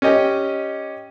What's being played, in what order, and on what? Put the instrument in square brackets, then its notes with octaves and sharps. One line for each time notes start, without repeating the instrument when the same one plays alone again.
[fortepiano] C#4 G4 D#5 G5